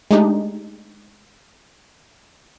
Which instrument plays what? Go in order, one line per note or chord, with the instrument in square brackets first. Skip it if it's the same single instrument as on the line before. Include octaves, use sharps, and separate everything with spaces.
[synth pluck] G#3 A3 D4 D#4 G4